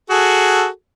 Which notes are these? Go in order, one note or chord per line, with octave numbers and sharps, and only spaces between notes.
F#4 G#4 A4